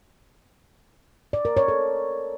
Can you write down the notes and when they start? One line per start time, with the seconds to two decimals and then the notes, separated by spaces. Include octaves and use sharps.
1.33 D5
1.45 A#4
1.57 C#5
1.68 A4